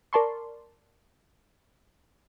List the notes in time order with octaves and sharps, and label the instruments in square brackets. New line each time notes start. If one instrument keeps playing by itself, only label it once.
[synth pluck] A#4 D5 A5 C6 C#6